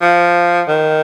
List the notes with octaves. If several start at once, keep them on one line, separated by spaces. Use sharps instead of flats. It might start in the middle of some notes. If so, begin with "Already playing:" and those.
F3
D#3